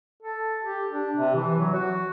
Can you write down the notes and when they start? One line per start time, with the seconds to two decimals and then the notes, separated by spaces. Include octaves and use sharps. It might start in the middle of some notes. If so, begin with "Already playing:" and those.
0.23 A4
0.64 G4
0.91 D4
1.16 C3
1.35 E3
1.59 F#3
1.74 F#4